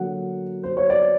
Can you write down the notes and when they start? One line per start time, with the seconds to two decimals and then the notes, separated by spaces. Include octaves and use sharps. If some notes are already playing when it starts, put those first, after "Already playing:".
Already playing: D3 F#3 A#3 F#5
0.63 C5
0.77 C#5
0.90 D5